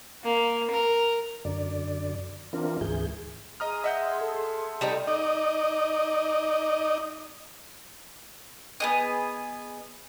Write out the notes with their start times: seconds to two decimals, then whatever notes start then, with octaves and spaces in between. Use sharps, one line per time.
0.23 A#3
0.70 A#4
1.45 F#2 D3 D5
2.53 E3 C4 D4 F4 A#4
2.81 D2 G#2 E3 G#4 G6
3.60 G#4 D#5 A#5 C6 D#6 F6
3.84 D#5 E5 F#5 G6
4.21 A4
4.81 G3 A3 D#4
5.07 D#4 D5 D#5
8.80 B3 G#4 D#5